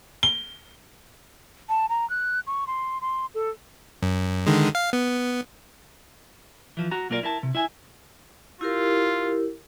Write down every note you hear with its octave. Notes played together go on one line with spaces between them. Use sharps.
G7
A5
A#5
F#6
C#6
C6
C6
A4
F#2
D3 D#3 G#3
F5
B3
E3 F3
F#4 A#5
B1 A#3 F4 A#4 D5
E4 A#4 A5
C3
E4 E5 G#5
E4 F4 G4 A#4